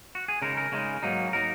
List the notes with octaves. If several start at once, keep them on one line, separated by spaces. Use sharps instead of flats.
F#4
G#4
C#3 G#3 D#4 A#4
A#4
C#3 G#3 D#4
G#2 F#3 A#3 D#4
F#3 A#3 D#4 A#4